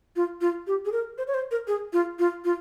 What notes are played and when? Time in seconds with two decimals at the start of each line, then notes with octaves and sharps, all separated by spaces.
0.16 F4
0.41 F4
0.67 G4
0.85 G#4
0.92 A#4
1.18 C5
1.27 C#5
1.34 C5
1.51 A#4
1.68 G#4
1.93 F4
2.19 F4
2.45 F4